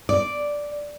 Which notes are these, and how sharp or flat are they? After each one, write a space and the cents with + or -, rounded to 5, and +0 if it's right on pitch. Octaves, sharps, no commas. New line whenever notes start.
D5 -5